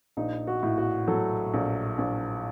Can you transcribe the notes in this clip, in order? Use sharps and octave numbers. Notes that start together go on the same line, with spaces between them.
A#1 D#4
F#4
A2
F#4
F#3 A4
A#1
A#1